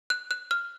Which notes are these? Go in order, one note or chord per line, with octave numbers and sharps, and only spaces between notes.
F#6
F#6
F6